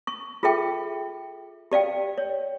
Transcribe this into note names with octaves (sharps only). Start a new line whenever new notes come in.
C#6
F4 G#4 A4 E5 G5
G4 D5 F5 G5
C#5